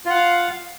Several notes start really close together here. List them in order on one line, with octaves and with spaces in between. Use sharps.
F4 F#5 F5